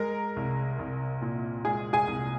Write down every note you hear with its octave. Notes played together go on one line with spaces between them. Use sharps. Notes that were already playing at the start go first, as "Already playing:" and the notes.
Already playing: G#3 A#4 A#5
C2
C2
A#2
G#3 G#4 G#5
G#4 G#5
C2